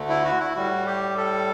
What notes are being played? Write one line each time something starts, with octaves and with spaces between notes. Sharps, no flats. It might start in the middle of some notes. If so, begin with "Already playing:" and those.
Already playing: D2 D3 A3
E4
F#4
E4
A2 G3 F#4
G4
A4